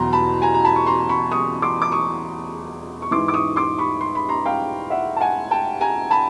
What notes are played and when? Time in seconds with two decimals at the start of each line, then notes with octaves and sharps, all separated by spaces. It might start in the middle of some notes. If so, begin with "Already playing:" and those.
Already playing: E2 B2 F#3 A#5 C6
0.13 A5 B5
0.42 G#5 A#5
0.54 A#5
0.65 A5 B5
0.76 C#6
0.86 A#5 C6
1.09 B5 C#6
1.31 C#6 D#6
1.62 C6 D6
1.82 D6
1.92 C#6 D#6
3.02 C#6
3.11 G#2 E3 C6 D6
3.28 D6
3.34 C#6 D#6
3.56 C6 D6
3.79 B5 C#6
4.01 C6
4.15 B5
4.29 A#5 C6
4.45 F5 G5
4.90 E5 F#5
5.16 A5
5.20 F#5 G#5
5.51 G5 A5
5.81 G#5 A#5
6.10 A5 B5